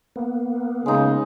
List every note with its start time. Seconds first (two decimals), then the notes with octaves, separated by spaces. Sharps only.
0.16 A#3 B3
0.86 C#3 G#3 D#4